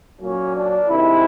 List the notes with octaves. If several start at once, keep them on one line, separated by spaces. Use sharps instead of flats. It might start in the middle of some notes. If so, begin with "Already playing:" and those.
A#2 F#3 A#3 C#4
D4
F2 C3 D#3 G#3 E4